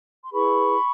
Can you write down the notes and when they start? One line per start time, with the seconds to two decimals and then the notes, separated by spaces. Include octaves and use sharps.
0.23 C6
0.33 E4 G#4 B4 B5 C#6